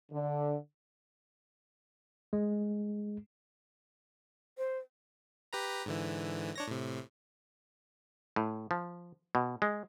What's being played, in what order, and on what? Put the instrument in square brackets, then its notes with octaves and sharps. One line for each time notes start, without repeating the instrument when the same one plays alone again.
[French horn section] D3
[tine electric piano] G#3
[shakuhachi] C5
[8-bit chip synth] G4 B4 A#5
G#2 D3 E3
D4 C#5 A#6
A2 C3
[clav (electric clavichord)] A2
F3
B2
G#3